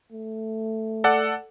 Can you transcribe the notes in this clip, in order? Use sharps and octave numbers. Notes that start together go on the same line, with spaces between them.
A3
A4 D5 F#5